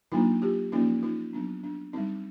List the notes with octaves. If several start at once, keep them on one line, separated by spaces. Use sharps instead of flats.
F#3 A#3 D4 D#4 F4
F4 G4
F3 A#3 C#4 D#4 F4
D#4 F4
F#3 B3 D4
D4
G3 C4 D#4